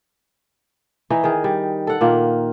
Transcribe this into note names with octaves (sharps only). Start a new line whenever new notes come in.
E3 D#4 D#5
D#3 G#4
G3
A4 F#5
A#2 D#3 A#3